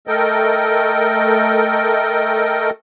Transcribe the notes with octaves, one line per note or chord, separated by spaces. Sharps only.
A3 A4 A#4 D#5 G5